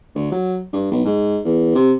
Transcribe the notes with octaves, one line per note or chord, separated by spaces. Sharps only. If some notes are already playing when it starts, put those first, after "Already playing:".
D2
F#3
G2
B1
G#2
E2
C3